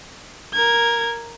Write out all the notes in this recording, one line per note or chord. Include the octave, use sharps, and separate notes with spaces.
A#4 G#6